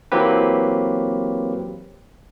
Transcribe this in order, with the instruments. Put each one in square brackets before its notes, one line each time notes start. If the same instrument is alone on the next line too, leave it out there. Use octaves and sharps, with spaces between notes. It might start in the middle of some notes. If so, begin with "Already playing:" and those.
[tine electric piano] E3 F#3 A#3 C4 G4 B4